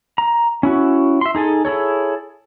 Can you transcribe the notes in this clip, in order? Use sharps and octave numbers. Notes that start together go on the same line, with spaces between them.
A#5
C#4 E4 F#4
E5 C6
D#4 G#4 A4 G#5
E4 G#4 A4 C#5